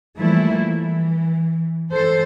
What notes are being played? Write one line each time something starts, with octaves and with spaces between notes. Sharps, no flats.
E3 F3 G3 A3 A#3 E4
E3
E3 A4 C5